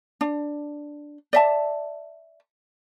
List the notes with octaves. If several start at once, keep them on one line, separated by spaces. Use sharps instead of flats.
D4
D5 E5 A5